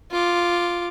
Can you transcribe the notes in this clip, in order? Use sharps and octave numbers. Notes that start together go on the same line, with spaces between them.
F4 D6